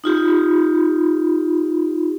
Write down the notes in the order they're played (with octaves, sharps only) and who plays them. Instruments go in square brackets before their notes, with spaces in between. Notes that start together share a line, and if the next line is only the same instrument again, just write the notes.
[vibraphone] D#4 F4 G4